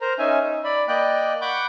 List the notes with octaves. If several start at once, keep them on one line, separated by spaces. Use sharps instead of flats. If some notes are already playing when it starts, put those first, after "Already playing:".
A#4 C5 A#5
C#4 D#4 E5 G#5
D#4
D5 B5
A#3 D5 D#5 G5 F#6
F#5 B5 C#6 D6 F#6 G6